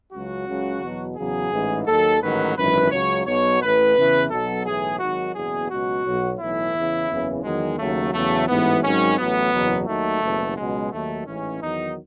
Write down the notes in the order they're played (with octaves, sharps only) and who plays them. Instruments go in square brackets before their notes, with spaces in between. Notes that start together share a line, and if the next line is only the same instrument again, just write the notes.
[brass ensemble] C#2 C#3 F#3 F#4
C#2 C#3 F#3
E2 B2 F#3
E2 C#3 F#3 G#4
A1 G#2 E3
D#2 D#3 F#3 A4
A1 G#2 D#3 F#3 B4
G#1 F#2 E3 B4
C#2 C#3 F#3 C#5
B1 B2 F#3 C#5
A1 A2 E3 B4
E2 C#3 E3
B1 B2 F#3 A4
B1 A2 E3 G#4
G#1 G#2 D#3 F#3 F#4
F#1 E2 B2 G#4
C#2 B2 F#3 F#4
B1 B2 F#3
B1 A2 E3 E4
E2 C#3 E3
F#1 E2 C#3 E3
E2 D#3 F#3 G#3
D#2 C#3 F#3 A3
E2 C#3 F#3 A3
A1 G#2 E3 B3
G#1 G#2 D#3 F#3 C#4
A1 A2 F#3 B3
F#1 E2 B2 F#3
D#2 D#3 F#3 A3
F#1 E2 B2
C#2 B2 F#3 G#3
D#2 D#3 F#3 A3
A1 G#2 E3 C#4
E2 D#3 F#3 D#4